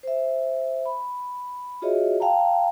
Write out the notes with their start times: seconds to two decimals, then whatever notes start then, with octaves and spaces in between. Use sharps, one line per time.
0.03 C5 E5
0.85 B5
1.82 F4 F#4 G#4 C#5 D#5 E5
2.20 F5 G5 A5 A#5